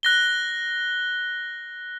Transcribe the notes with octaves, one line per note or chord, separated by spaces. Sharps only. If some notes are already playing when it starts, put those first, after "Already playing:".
F#6 A#6 G7